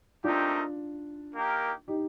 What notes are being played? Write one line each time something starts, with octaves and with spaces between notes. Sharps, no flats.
A3 C4 D4 D#4 F4 G4 A#4
A#3 D#4 G4 A#4
D#4 G4